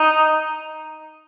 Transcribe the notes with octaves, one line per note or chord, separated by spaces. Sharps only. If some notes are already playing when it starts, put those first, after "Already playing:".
Already playing: D#4